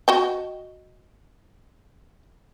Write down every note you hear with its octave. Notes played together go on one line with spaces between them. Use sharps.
F#4 D#5 G5